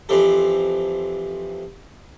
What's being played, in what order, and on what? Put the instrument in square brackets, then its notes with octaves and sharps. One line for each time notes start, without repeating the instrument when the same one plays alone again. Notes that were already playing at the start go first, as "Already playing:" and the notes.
[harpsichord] F2 E3 C4 G4 A4